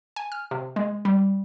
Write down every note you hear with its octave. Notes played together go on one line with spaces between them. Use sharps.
G#5
F6
C3
G#3
G3